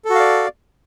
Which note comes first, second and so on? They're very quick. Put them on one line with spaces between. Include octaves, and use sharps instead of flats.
A4 F#4 F5 D5